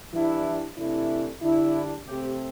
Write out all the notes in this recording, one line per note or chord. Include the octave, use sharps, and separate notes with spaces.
E3 G3 D4 E4
C3 E3 A3 D4 E4
D3 G3 D4 E4
C3 A3 C4 G4